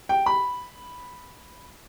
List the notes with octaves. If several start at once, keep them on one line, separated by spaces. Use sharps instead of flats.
G5
B5